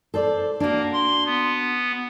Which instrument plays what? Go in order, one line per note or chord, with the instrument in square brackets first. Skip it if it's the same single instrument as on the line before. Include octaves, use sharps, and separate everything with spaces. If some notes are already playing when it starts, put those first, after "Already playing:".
[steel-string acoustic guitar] A4 C5 D5
[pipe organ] A#3 [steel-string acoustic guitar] D4 F#4
[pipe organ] C6
B3